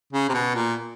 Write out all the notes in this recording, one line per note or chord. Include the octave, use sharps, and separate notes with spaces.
C#3
C3
B2
A#2